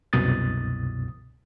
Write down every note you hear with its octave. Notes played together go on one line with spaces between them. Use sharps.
C2 F#2 B2 D#6 A6